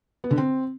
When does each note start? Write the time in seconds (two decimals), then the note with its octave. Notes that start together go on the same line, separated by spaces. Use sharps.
0.24 B3
0.31 D3
0.38 C4